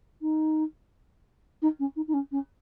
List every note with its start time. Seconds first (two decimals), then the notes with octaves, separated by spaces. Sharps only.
0.22 D#4
1.62 D#4
1.79 C#4
1.96 D#4
2.08 D#4
2.14 C#4
2.32 C#4